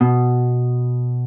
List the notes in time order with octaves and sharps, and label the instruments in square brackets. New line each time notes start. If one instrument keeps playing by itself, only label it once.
[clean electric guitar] B2